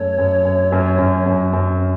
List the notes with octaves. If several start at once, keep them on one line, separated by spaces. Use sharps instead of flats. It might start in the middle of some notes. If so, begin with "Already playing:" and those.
Already playing: F#2 A3 C#5
F#2
F#2
F#2
F#2
F#2
F#2